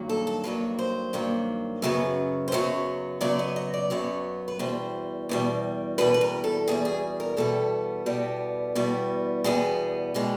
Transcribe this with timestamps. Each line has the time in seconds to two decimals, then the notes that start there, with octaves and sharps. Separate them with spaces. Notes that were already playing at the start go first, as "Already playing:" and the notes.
Already playing: G2 D#3 F#3 A#3
0.09 A4
0.27 A4
0.44 G2 D#3 F#3 A#3 B4
0.79 C5
1.13 G2 D#3 F#3 A#3
1.82 F#2 C#3 F#3 B3
2.48 C5
2.52 F#2 C#3 F#3 B3 C#5
3.21 F#2 C#3 F#3 B3 D5
3.39 D#5
3.56 D#5
3.74 D5
3.90 F#2 C#3 F#3 B3 C#5
4.48 B4
4.59 E2 B2 G3 C5
5.29 E2 B2 G3
5.98 E2 B2 G3 B4
6.14 B4
6.21 A#4
6.44 A4
6.68 E2 B2 G3 G#4
6.85 G#4
7.20 A#4
7.37 E2 B2 G3 B3 A4
8.06 E2 B2 G3 B3
8.75 E2 B2 G3 B3
9.44 E2 B2 G3 B3 G#4
10.14 B2 G#3 B3 G4